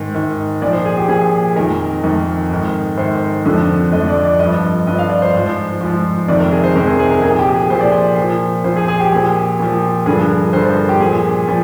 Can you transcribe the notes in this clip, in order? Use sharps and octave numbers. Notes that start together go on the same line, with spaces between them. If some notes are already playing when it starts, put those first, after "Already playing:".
Already playing: G#2 D#3
G#2 D#3
A#2 F3 D5
C5
G#4
G4
A#2 F3 G#4
F2 D#3 A#4
F2 D#3
G#2 D#3
G#2 D#3 C5
F2 D3 F3
F2 D3 F3 D#5
D5
D5
G2 F3 D#5
G2 F3 D#5
F5
D5
C5
G#2 F3
G#2 F3
F2 C3 D#3 D5
A#4
G#4
C5
F2 C3 D#3 A#4
G#4
G#4
A#4
A#2 F3 G#4
G4
G#4
A#2 F3 C5
D5
C5
A#2 F3
A#2 F3 C5
G#4
G#4
G4
A#2 F3
A#2 F3
G2 D3 F3 G#4
A#4
G2 D3 F3 C5
C5
A#4
G4
A#2 F3 G#4
A#2 F3